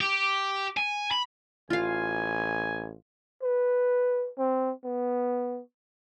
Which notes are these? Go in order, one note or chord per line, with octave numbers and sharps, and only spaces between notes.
G4
G#5
B5
A1 F4 F5 G#5
B4
C4
B3